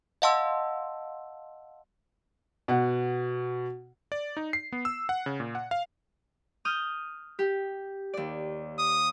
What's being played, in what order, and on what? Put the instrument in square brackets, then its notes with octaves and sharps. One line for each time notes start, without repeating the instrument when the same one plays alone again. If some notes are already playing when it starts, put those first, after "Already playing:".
[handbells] D#5 F5 F#5 A5 C6 E6
[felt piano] B2 F#5
[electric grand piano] D5
D#4
C7
B3
E6
F#5
C#3
A#2
F#5
F5
[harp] D#6 F6 G6
G4
D#2 D5
[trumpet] D#6